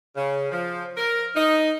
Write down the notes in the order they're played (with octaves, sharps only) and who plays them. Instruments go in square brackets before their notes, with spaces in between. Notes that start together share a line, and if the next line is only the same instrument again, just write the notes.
[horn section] C#3
F3
A#4
D#4